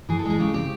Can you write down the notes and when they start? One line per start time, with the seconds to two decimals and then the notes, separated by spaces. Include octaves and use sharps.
0.09 E3 G#4
0.19 A4
0.25 G#3 G#4
0.40 C#3 G4
0.54 C4 G4